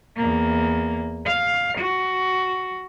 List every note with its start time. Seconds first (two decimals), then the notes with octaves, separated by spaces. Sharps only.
0.17 E2 A#3
1.26 F5
1.78 F#4